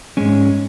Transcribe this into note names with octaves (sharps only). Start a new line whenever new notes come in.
G#2 G#3 C#4